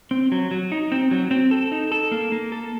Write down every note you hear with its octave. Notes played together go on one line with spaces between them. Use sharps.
C4
F#3
F#3
D#4
C4
F#3
C4
A4
D#4
A4
A#3
A#3
A4